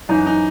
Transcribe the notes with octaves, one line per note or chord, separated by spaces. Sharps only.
F#2 E3 D#4
D#4